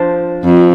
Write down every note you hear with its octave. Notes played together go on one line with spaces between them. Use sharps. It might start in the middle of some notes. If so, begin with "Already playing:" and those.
Already playing: F3 D4 C5
F2